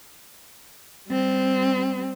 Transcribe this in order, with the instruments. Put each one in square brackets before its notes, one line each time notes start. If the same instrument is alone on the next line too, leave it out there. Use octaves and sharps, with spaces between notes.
[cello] G3 C4